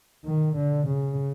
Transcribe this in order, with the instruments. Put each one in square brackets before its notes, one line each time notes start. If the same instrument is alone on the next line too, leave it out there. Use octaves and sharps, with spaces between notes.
[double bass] D#3
D3
C#3